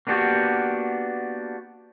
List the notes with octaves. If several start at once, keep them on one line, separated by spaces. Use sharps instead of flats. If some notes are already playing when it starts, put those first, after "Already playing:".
A#3 B3 D4 F#4 G4